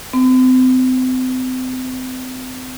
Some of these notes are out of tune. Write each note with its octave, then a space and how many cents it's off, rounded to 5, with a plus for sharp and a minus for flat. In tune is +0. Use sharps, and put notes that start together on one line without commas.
C4 -35